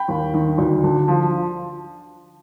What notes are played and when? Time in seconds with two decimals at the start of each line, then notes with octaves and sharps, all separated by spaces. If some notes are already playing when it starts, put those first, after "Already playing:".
Already playing: G5 B5
0.08 D#2
0.34 D#3
0.58 D2
0.83 D3
1.08 F3